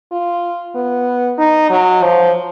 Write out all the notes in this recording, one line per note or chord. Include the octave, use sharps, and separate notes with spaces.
F4
B3
D#4
F#3
F3